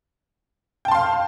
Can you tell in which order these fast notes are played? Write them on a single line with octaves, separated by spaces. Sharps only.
G5 A5 C6 F5